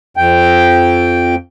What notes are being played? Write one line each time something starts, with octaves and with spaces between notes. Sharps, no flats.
F2 G5